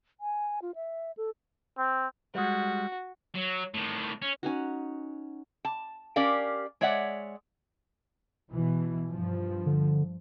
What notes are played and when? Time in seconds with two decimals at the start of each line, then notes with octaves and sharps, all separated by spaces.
0.20 G#5
0.62 F4
0.75 E5
1.17 A4
1.78 C4
2.35 G3 G#3 F#4
3.35 F#3
3.74 A2 D#3
4.22 C#4
4.43 C#4 D#4 F#4
5.65 A5
6.16 C#4 G4 A#4 D5 F5
6.81 G#3 C#5 D5 E5 F#5
8.50 B2 E3
9.09 G2 F3
9.66 D3